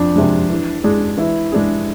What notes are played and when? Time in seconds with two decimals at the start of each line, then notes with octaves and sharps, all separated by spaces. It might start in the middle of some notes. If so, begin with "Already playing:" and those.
Already playing: F2 D4
0.16 C3 G#3
0.50 E3
0.83 G#3 D4 G#4
1.17 E3 E4
1.52 G#3 D4 G#4